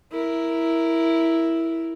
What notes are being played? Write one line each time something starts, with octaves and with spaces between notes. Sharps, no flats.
E4 A#4